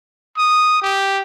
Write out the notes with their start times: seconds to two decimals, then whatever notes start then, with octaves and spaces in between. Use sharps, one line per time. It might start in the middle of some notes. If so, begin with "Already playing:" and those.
0.37 D#6
0.82 G4